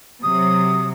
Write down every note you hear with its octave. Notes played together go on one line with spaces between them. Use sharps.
C3 F#3 D#6